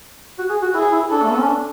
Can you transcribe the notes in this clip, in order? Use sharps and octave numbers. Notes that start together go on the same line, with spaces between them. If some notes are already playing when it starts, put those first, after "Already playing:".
F#4
G#4
F#4
E4 G#4
E4
D4 A4
A3
B3
C#4
D4